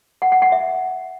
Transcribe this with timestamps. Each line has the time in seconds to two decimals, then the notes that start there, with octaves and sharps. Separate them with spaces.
0.22 F#5
0.32 F#5
0.42 F#5
0.52 E5